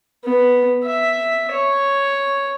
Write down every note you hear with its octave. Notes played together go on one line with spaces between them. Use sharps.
B3
E5
C#5